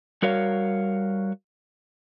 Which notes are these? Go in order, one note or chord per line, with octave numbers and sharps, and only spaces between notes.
G3 F#4 A#4 C#5 F5